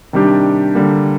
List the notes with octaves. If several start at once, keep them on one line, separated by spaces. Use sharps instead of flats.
C3 D#3 G3 D4 G4
D3 G3 A#3